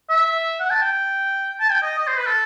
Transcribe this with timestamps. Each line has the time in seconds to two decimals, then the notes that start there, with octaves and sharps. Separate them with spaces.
0.09 E5
0.60 F#5
0.70 A5
0.82 G5
1.60 A5
1.71 G5
1.82 D#5
1.98 D#5
2.08 C5
2.17 B4
2.26 A4